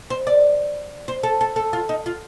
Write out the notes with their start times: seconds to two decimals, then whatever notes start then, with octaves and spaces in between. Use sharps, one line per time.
0.10 C5
0.27 D5
1.08 C5
1.23 A4
1.41 A4
1.56 A4
1.73 F4
1.89 D#4
2.06 F4